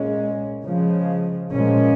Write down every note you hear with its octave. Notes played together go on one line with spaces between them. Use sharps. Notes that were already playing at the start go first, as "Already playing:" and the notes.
Already playing: A#2 G#3 C#4
C#3 F3 G#3
A#2 F3 G#3 C#4